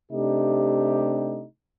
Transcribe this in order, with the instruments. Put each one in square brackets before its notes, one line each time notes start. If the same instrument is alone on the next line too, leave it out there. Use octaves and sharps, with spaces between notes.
[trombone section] C3 A3 D4 D#4 G4